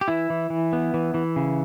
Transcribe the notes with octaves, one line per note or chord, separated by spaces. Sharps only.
G4
E3 E4
E3
E3
B3
E3
E3
C#3